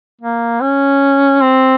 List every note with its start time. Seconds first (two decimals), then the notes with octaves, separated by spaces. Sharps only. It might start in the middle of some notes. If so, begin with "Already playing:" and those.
0.21 A#3
0.61 C#4
1.41 C4